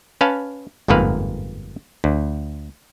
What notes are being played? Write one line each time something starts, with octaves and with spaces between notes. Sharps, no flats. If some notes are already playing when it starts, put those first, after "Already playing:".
C#4 B4 F5 A5
G1 F2 G#2 A#3 B4 F5
D2